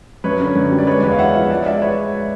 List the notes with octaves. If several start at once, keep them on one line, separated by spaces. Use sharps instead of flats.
F#2 B4 C#5
D3
F#2
G3
D5
G#3 B4 C#5
E2 B4 C#5
F5
G#3 E5 F#5
F3
G#3 D5 E5
G#3 D5 E5
G#3 B4 C#5